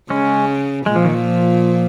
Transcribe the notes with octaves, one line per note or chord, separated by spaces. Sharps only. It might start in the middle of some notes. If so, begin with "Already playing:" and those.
C#3 G#3 C#4
A#2 G#3
F3
D#3
F3